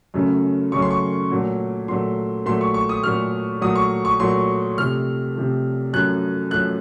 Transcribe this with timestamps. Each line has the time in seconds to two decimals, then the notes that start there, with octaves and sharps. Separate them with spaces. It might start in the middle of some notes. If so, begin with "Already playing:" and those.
0.14 F#2 C#3 A3
0.72 F#2 C#3 A3 C#6
0.82 C6
0.91 C#6
1.30 A#2 F#3 A3
1.88 A#2 F#3 A3 C6
2.46 A#2 F#3 A3 C6
2.61 C#6
2.74 C#6
2.89 D#6
3.03 A#2 F#3 A3 F6
3.61 A#2 F#3 A3 D#6
3.75 C#6
4.05 C#6
4.20 A#2 F#3 A3 C6
4.78 C3 F3 A3 F6
5.35 C3 F3 A3
5.93 F#2 F3 A3 F#6
6.51 F#2 F3 A3 F#6